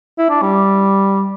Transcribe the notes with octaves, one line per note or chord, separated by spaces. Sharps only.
E4
D4
G3